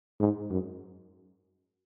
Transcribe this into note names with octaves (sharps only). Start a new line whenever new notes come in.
G#2
F#2